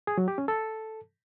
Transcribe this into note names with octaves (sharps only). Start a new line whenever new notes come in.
G#4
F#3
G4
C#4
A4